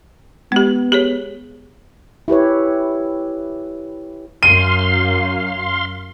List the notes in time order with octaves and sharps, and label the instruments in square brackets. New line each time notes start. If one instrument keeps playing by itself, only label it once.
[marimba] G#3 G4 [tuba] B3
[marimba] G4 G#4 C#5
[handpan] E4 G4 B4 C#5
[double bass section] F#2 [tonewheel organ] F5 C6 [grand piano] D#7